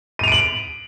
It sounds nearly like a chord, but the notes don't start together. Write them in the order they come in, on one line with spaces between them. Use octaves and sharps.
D#7 F7 D7 F#7